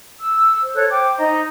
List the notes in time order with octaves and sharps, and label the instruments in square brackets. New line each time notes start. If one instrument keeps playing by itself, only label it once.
[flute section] E6
[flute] C5
[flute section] A4 C#5 F#6
G5 D6
D#4 D#5 A#5